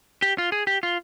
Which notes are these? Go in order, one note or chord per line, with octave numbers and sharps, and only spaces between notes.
G4
F4
G#4
G4
F4